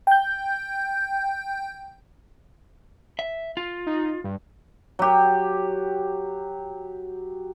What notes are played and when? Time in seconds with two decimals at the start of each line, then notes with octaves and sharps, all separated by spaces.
0.07 G5 G6
3.19 E5
3.57 F4
3.87 D#4
4.24 G2
4.99 F#3 G4